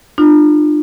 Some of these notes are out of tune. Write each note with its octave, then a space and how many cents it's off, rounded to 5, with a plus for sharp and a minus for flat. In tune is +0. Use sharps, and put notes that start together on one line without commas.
D4 +40 F4 +0